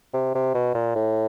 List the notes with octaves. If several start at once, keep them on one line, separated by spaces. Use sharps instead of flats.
C3
C3
B2
A#2
A2